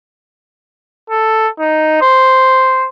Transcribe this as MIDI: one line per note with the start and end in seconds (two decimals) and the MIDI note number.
1.10 1.48 69
1.59 2.01 63
2.02 2.88 72